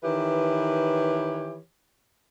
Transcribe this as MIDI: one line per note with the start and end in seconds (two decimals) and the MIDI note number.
0.04 1.59 51
0.04 1.59 52
0.04 1.59 67
0.04 1.59 71
0.04 1.59 73